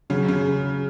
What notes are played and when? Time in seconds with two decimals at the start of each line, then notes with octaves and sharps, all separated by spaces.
0.10 C#3 F#3
0.28 C#3